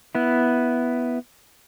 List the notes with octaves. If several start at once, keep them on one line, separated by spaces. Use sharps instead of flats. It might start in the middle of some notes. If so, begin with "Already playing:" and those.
B3 E4